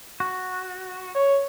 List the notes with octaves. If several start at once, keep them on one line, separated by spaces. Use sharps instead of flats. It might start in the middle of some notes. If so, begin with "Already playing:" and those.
F#4
C#5